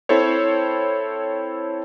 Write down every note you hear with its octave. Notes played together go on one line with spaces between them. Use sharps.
C4 E4 A4 C5 C#5